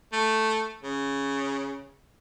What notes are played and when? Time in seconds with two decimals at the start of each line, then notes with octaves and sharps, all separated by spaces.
0.13 A3
0.83 C#3